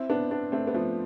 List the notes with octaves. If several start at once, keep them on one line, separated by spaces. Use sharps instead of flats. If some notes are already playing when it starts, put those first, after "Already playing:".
Already playing: C4 E4
B3 D4
B3 D4
A3 C4
B3
F3 A3